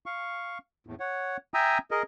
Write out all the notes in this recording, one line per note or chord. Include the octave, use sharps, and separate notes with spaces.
F5 C#6
E2 A2
C#5 F#5
E5 G5 G#5 A#5 D#6 E6
G#4 A#4 D#5